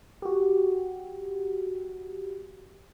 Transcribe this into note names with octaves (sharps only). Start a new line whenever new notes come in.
F#4 G4